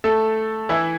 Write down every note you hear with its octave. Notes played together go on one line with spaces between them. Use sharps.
A3 A4
E3 E4